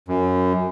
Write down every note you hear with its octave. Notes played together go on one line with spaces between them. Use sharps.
F#2